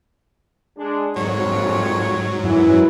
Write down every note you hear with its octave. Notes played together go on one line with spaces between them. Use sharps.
G#3 D4
A#1 F2 G#2 F#3 C#5
F#2 E3 E4